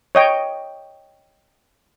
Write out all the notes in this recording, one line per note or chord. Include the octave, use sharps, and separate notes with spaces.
C#5 D#5 G5